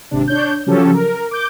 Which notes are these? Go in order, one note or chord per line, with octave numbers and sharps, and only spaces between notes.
G#1 C3 D4
D4 C#5 G6
C#3 F3 F#3 C#4 G4 A4
A#4
D6 G6